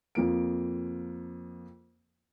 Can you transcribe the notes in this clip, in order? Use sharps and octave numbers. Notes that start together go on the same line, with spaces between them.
F2 F3 A#3 D7